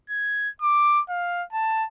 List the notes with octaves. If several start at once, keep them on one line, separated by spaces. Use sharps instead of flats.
G#6
D6
F5
A5